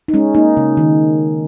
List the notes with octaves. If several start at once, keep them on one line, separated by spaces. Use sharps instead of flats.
D#4
G#3 C#4
A#3 D#4
C#3
D#3